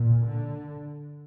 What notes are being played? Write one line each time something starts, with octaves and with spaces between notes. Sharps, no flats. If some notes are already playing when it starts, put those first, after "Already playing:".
Already playing: A#2
D3